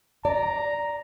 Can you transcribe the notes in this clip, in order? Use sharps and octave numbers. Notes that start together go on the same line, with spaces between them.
D5 A#5